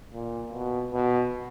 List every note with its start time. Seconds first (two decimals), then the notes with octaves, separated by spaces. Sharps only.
0.13 A#2
0.53 B2
0.93 B2